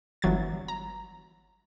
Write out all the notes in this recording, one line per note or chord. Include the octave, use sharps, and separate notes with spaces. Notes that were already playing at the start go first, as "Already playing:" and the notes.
G1 E3 F#3 G#6 A6
A#5